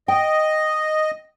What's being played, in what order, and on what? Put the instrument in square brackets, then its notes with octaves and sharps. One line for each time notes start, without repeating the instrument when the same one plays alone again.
[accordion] D#5 [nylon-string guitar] G5